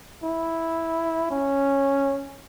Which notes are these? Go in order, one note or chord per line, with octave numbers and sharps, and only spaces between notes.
E4
C#4